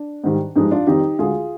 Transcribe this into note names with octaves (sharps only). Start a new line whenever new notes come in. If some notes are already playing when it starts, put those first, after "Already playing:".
Already playing: D4
G#2 D#3 G3
G2 F3 G#3 D#4
D4 F4
F2 D#3 G3 D#4 G4
D2 D3 G#3 F4 G#4